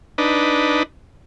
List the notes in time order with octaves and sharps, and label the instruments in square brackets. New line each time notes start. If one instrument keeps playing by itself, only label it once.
[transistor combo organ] D4 D#4 B4